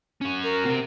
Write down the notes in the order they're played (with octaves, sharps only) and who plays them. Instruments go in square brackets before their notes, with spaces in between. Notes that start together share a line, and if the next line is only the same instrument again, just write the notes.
[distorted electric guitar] C#4 F#4
[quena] A#4
[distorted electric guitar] C3 C4